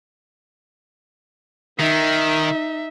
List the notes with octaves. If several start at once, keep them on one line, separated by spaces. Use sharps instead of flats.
D#3 D#4 E5